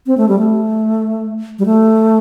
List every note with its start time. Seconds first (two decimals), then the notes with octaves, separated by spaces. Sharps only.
0.07 C4
0.18 A3
0.29 G3
0.39 A3
1.59 G3
1.66 A3